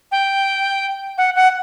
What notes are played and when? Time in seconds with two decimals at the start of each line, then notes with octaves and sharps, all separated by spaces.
0.12 G5
1.18 F#5
1.36 F#5